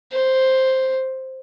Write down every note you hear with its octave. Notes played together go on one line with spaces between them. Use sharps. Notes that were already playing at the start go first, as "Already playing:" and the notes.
C5